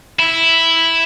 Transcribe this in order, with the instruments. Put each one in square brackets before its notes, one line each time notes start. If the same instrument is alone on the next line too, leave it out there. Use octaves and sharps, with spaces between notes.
[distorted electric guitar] E4